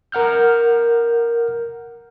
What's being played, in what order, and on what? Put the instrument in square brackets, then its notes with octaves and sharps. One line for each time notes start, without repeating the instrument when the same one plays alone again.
[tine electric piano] A#4 F#5 F6 G6